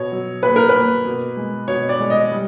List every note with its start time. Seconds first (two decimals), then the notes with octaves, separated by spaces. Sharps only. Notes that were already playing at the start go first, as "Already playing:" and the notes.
Already playing: B2 C#5
0.12 F#3
0.43 A#3 B4
0.56 A#4
0.69 B4
0.74 A#3
1.05 B2
1.37 G#3
1.68 B2 C#5
1.89 D5
2.00 G#3
2.10 D#5
2.32 G3